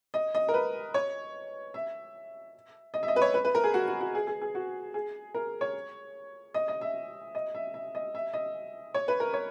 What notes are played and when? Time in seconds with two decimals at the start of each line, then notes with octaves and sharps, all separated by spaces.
0.14 D#5
0.35 D#5
0.49 A#4
0.54 B4
0.94 C#5
1.74 E5
2.94 D#5
3.03 E5
3.08 D#5
3.16 B4
3.22 C#5
3.34 B4
3.45 B4
3.55 A#4
3.64 G#4
3.74 F#4
3.88 F#4
4.01 F#4
4.15 G#4
4.27 G#4
4.42 G#4
4.55 F#4
4.94 G#4
5.34 A#4
5.61 C#5
6.54 D#5
6.68 D#5
6.81 E5
7.35 D#5
7.55 E5
7.74 E5
7.95 D#5
8.15 E5
8.34 D#5
8.94 C#5
9.08 B4
9.20 A#4
9.33 C#5